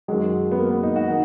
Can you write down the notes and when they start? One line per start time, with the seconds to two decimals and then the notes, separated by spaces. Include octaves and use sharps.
0.08 F#2 D#3 F#3 G#3
0.52 B3
0.59 A#3
0.71 B3
0.83 D#4
0.96 F#4
1.08 D#3 D#4